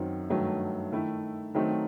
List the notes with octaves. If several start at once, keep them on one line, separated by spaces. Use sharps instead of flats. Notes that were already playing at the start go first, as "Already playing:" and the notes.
Already playing: F#2 D#3 F#3 C4 D#4
G2 D#3 F#3 A3
D#3 A3 E4
D#3 F#3 A3 C4 D#4